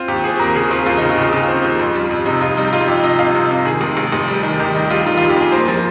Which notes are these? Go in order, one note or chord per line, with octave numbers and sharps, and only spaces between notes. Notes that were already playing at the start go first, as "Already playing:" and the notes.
Already playing: C4 F4
D#2 G4
C4 G#4
D#2 A#4
C#3 G#4
C4 F4
D#2 F4
C#3 D#4
F4
C#3 D#4
C#3 F4
C4
D#2
F2
G3
F2
C3 D#4
F2 F4
G3 D#4
G3 F4
F2 G4
C3 D#5
C3 F5
C3
C3
D#3 G#4
F1
F1
F1
G3
D#3
D#3 G4
G3 D#4
G3 F4
D#3 F4
F2 F4
G4
F2 G#4
A#3 C5
F3